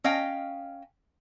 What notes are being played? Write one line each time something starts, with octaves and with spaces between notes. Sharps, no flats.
C#4 D#5 F5 G5